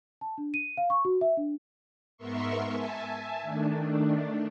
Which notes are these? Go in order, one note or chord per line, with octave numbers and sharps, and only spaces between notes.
A5
D4
D#7
F5
C#6
F#4
E5
D4
G#2 B3 A#4 E5 C6 C#6
E5 G#5 A5
D#3 A3 D4